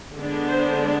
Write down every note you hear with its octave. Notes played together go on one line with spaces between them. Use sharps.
D3 G#3 B3 D4
C5